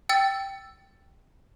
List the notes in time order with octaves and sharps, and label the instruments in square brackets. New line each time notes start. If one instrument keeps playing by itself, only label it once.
[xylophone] G5 E6 A6